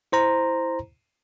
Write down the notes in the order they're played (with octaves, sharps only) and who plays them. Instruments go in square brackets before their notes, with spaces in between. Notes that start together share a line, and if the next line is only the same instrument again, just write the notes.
[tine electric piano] E4 C5 A#5